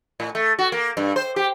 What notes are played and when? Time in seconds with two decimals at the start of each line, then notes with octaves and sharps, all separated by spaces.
0.20 A2
0.35 A3
0.59 F#4
0.72 A#3
0.97 G2
1.16 C5
1.36 G4